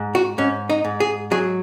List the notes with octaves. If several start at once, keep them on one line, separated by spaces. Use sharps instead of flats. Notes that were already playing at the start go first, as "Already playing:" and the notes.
Already playing: G#2
F#4
G#2 C#4
D#4
G#2
G#4
F#3 G#4